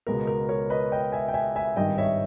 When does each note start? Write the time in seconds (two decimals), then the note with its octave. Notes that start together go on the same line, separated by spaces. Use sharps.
0.07 C#2 B2 G#3 B3 A#4
0.27 A#4
0.49 A#4 C#5
0.70 B4 D#5
0.92 D#5 G5
1.12 E5 G#5
1.28 G5
1.34 E5 G#5
1.56 E5 G#5
1.76 G#1 G2 D#3 G3 D#5 G5
1.98 C#5 E5